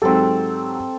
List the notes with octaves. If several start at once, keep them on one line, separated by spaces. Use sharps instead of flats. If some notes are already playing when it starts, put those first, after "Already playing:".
G#2 F#3 C4 G4 A4